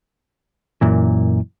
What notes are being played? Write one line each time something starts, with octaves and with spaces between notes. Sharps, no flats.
F#2 A#2 E3